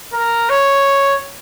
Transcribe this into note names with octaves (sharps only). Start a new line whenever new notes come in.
A#4
C#5